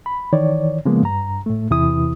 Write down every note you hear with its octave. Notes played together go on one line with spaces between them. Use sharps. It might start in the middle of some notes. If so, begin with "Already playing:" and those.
B5
D#3 E3 C#5 D5
C#3 F3 G#3 A#3 B3
G2 A#5
A2 A3
E2 C3 E3 E4 D#6